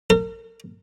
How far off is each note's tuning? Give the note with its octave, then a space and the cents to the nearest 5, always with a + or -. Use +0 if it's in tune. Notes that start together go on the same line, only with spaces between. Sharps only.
A#4 -40